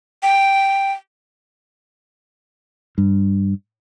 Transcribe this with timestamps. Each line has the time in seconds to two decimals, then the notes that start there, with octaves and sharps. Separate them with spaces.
0.23 G5
2.98 G2